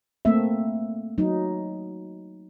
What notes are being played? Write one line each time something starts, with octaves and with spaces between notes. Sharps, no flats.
A3 A#3 C4 E5
F#3 D#4